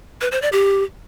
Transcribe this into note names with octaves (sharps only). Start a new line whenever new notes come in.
B4
C5
D5
G4